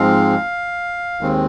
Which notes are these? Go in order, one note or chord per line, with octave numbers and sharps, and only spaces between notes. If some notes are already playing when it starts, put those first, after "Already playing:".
Already playing: G#2 F3 G#3 C4 F5
D#2 D#3 G#3 C4